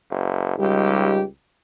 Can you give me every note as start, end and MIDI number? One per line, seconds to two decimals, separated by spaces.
0.11 0.54 30
0.59 1.28 37
0.59 1.22 55
0.59 1.22 63
0.59 1.22 67